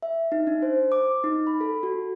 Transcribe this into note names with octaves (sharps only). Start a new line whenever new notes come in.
E5
D#4
D4
C5
D6
D#4
B5
A4
F#4